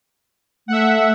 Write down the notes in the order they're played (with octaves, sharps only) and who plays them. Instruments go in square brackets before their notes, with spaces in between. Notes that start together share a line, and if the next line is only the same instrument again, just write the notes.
[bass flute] A3 [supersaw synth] E5 F#5